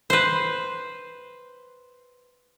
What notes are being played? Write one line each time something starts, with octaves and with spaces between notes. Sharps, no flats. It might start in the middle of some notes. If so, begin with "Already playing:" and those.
B4 C5